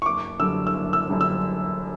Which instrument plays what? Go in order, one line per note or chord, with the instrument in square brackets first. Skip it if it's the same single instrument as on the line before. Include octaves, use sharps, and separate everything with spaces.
[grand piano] C#6
[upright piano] F#1 [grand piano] D6
[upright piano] F#2 D3 G3 D4 [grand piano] E6
[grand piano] E6
[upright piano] F#1
[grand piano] E6
[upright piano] F#2 D3 G3 D4
[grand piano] E6